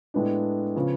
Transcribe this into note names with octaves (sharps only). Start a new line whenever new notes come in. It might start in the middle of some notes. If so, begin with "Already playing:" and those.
A2 G#3 B3 D4
C#3 F3 B3